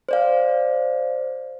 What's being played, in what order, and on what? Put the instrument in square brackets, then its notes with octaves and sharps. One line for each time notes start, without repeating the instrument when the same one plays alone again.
[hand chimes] C5 D5 F5